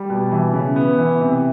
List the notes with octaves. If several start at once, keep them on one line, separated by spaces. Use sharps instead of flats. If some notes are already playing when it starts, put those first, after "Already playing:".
Already playing: G3
B2
E3
C#3
B3
E3
C3